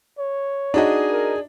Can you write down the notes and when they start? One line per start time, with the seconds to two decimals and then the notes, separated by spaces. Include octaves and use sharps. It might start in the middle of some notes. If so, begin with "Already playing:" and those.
0.19 C#5
0.74 D4 D#4 F#4 G#4 D#5
1.12 A#4